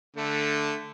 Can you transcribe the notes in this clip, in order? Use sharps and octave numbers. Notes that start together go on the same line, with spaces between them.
D3 A3